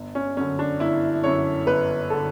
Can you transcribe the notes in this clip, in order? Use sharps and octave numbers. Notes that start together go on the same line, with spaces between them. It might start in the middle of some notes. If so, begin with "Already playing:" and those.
Already playing: G1
C#4
F#2 D3 C#4
D4
G1 E4
F#2 D3 C#5
G1 B4
D3 A4